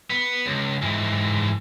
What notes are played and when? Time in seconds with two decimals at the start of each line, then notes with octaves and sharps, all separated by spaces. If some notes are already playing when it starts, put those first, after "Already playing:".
0.10 B3
0.46 C#2
0.82 G#2 E3